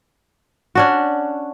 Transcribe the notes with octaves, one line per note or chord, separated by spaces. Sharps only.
C#4 D4 F#4